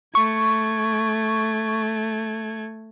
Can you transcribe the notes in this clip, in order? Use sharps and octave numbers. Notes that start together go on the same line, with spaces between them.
A3 C#6 G#6